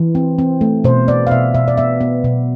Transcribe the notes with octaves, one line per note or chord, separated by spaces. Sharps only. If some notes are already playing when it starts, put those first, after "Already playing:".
Already playing: E3
C4
C4
A3
B2 C5
B3 D5
F5
B2 E5
B2 E5
D5
B3 E5
B3
B2